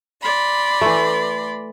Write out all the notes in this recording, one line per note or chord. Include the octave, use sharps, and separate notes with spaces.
D5 B5 C6
E3 A3